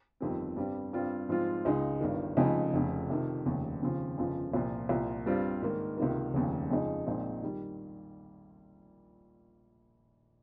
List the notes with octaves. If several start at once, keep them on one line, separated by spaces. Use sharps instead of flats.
G1 F2 D#3 G3 C4
G2 G3 C4
G2 G3 C4 F4
G#2 F3 C4 F4
C#2 C#3 G#3 D#4
G1 G2 D#3
F1 F2 C#3 G#3 D#4
F1 F2 C#3
F2 C3 D#3
F1 D#2 C#3
D#2 C#3 F3 C4
G1 F2 C#3 F3
C2 A#2 F3
C2 A#2 F3
G2 G3 C4 F4
G#2 D#3 A#3
C#2 C3 D#3 A#3
F1 D#2 C#3
F2 C#3 G#3 D#4
A#1 A#2 G#3 C4 D#4
D#3 G3